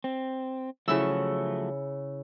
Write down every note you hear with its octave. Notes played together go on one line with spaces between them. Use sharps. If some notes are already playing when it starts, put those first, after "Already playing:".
C4
C#3 F3 F#3 A3 E4 E6